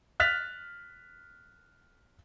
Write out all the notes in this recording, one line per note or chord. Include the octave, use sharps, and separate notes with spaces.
F6 F#6 A6 B6 F7